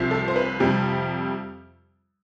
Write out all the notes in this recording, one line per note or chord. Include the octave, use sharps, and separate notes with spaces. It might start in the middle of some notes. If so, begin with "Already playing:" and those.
Already playing: C2 C3 F3
A4
C5
B4
F2 C3 G3